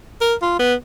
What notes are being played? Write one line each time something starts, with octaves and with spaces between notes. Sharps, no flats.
A#4
F4
B3